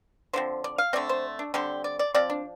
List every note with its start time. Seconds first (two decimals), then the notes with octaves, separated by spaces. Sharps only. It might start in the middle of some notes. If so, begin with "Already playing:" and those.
0.33 D3 F3 C4 C5
0.64 D5
0.78 F5
0.93 D3 A3 C4 D5
1.09 C5
1.39 D4
1.54 D3 G3 C4 G4
1.84 D5
1.99 D5
2.15 F3 C4 D5
2.30 D4